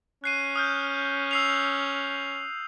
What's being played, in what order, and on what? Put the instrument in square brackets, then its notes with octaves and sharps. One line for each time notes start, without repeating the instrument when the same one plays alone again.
[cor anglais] C#4 [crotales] F#6 C7 D#7
[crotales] D#6 F6 G6
E6 C7 F7